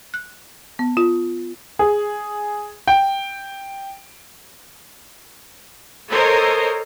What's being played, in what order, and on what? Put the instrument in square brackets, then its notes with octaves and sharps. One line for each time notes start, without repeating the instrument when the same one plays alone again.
[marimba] F#6
B3
F4
[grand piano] G#4
G5
[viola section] A4 A#4 C5 C#5 D#5